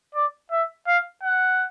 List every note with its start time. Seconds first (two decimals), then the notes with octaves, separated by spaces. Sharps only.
0.15 D5
0.52 E5
0.87 F5
1.24 F#5